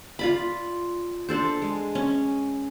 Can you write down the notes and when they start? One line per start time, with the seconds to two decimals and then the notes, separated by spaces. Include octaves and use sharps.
0.19 F4 D5 B5
1.29 D4 A4 C5
1.62 G#3
1.95 C#4